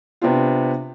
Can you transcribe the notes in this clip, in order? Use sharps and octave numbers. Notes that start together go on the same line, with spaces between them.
C3 B3 C4 D4 F4